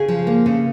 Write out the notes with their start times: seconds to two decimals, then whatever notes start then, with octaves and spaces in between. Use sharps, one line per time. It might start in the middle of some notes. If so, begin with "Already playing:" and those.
Already playing: C#3 G#4
0.08 F3
0.27 A#3
0.46 C#3